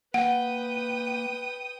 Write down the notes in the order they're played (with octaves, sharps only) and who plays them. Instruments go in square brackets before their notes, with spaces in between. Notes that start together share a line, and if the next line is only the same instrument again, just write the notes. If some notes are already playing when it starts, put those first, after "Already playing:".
[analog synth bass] A#3 [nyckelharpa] B4 [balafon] F#5 [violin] G5 D#6